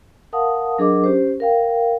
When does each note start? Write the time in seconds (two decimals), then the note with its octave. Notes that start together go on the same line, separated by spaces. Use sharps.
0.33 A#4 F5 F#5 A5 D#6
0.78 F#3 D4 G#4 A#4 D#5 D6
1.04 C#4 G4 C5
1.40 A#4 F5 G5